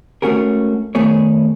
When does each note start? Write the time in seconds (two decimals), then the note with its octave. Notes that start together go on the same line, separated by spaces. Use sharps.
0.22 G#3 A3 C#4 F#4 G#4 A#4
0.95 D#3 A3 B3 G#4 C#5